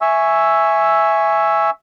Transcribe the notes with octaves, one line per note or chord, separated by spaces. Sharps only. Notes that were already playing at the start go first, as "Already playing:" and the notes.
E5 G#5 C#6 E6